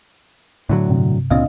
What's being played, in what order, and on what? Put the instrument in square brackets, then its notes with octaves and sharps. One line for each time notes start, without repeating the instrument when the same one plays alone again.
[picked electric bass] A2 D3 F#3
[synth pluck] G2 C3
[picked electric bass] C#2 A#2 C4 [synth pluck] D4 D#5 F5